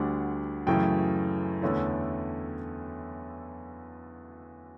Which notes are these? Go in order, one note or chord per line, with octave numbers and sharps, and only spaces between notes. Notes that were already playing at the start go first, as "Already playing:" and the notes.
Already playing: D2 D3 G3 D4 F#5
F#2 C#3 E3 A3 G5
E2 D3 A3 C#4 E4